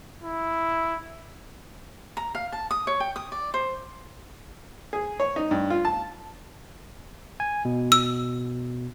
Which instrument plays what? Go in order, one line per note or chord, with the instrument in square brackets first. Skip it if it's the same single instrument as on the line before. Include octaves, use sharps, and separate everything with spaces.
[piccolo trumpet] E4
[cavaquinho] A#5
F5
A5
D#6
C#5
G5
D#6
D5
C5
[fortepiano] G#4
C#5
D#4
G2
F4
A5
[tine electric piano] G#5
B2
[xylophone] E6